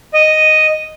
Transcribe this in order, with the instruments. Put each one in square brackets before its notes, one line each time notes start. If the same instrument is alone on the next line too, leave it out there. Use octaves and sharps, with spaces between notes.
[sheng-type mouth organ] D#5